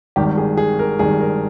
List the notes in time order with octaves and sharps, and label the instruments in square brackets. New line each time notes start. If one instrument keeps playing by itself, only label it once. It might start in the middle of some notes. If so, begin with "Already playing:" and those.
[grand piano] G#1 G2 D#3 G4
G#4
G#4
A#4
G#1 G2 D#3 G#4
A#4